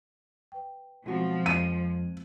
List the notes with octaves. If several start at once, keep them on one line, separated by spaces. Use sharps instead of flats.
B4 G5
B1 F3 G#3 C4 F#4
F2 D#7